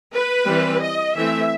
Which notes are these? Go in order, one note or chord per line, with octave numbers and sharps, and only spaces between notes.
B4
E3 G3 C4
D#5
E3 A3 C4 E5